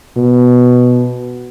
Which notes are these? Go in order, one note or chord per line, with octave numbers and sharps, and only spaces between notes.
B2